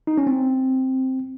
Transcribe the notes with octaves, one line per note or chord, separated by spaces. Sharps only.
D#4
C#4
C4